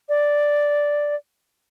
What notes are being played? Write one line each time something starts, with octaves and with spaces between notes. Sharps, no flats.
D5